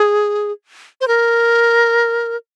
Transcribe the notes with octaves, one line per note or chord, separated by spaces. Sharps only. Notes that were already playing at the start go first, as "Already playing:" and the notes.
Already playing: G#4
C5
A#4